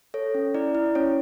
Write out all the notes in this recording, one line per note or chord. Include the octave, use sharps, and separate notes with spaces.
A4 C#5
C#4
E4 D5
E4
C#4 C#5